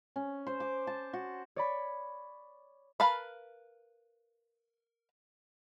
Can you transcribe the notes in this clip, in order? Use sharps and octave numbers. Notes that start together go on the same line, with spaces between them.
C#4
C5
D6
A5
F#4
C#5 D5 B5
A#4 B4 F5 A5 B5